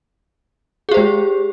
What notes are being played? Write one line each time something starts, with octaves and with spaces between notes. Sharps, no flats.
G#3 G4 G#4 C5